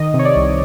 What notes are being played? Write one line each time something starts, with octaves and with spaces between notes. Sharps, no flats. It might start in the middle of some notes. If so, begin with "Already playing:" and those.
Already playing: D#3 D#5
C3
C#5
D5
C2